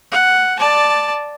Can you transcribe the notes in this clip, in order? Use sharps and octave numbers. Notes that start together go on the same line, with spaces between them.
F#5
D5 A5